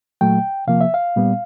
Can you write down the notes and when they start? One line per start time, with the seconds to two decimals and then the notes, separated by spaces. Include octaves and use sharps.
0.21 A#2 F#3 A3 G5
0.67 C3 F3 A#3 F5
0.81 E5
0.94 F5
1.16 A#2 G3 B3